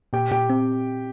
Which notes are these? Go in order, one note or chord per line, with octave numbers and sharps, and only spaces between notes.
A#2 G4 G5
A#2 G4 G5
C4